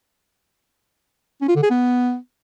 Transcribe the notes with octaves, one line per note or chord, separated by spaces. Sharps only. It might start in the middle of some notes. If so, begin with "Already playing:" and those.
C#4
F4
D3
G#4
B3